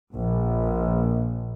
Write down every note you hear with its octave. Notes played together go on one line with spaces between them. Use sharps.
A#1